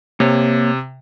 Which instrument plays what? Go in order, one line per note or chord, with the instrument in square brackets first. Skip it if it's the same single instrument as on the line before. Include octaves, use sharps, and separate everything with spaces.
[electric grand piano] C3 [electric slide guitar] A#3 C#5